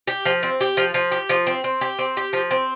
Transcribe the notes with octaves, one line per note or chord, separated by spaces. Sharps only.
G4
F3
C4
G4
F3
F3
G4
F3
C4
C4
G4
C4
G4
F3
C4